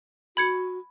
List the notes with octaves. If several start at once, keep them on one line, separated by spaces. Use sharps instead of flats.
F#4 B5 G#6 C#7